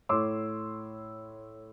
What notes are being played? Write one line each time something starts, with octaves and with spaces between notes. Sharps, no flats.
A2 C#5 C6 D6 E6